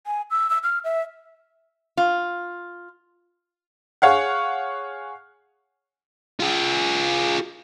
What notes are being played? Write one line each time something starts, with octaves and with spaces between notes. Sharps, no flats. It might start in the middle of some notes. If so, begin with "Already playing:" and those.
G#5
E6
E6
F6
E5
F4
G#4 C#5 F5 F#5
F4 G#4